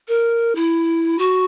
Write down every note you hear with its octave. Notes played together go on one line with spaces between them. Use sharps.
A#4
E4
F#4